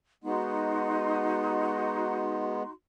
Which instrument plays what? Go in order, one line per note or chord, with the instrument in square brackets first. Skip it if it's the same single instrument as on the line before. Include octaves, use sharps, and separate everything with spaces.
[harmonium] G#3 B3 [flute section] D#4 F#4 C6